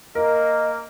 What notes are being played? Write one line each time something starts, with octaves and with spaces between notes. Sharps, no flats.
A#3 A#4 D#5